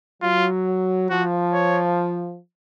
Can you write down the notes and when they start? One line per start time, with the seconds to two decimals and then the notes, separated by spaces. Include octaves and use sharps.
0.22 F#3 F4
1.10 F3 F#4
1.53 C#5